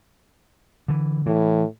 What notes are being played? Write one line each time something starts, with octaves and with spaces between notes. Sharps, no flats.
D3 E3
A2 E3